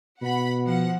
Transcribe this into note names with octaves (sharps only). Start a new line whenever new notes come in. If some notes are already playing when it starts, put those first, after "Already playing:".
B2 F#5 B5
F3 F#5